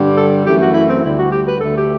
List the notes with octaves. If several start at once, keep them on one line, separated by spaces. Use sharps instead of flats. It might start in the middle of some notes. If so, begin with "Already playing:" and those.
Already playing: G2 D3 G3
A4
F#2 E3 A3 G4
F#4
E4
C4
D2 D3 G3 E4
F#4
G4
B4
D2 D3 A3 A4
G4